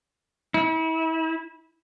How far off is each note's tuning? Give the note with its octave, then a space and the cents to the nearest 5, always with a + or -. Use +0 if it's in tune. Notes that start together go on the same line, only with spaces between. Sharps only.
E4 -35